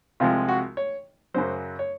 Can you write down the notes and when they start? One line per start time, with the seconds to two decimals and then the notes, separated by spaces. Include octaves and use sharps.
0.20 C2 C3 F3 G#3 F4
0.49 F#4
0.77 C#5
1.34 F#2 C#3 F#3 C5
1.79 C#5